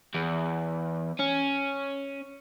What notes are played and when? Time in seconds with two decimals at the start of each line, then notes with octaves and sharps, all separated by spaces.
0.15 E2
1.20 C#4